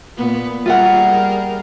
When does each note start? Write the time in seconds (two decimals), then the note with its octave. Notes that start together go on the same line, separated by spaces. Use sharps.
0.17 A#2 B3
0.66 G3 F4 G#4 A#4 E5 F#5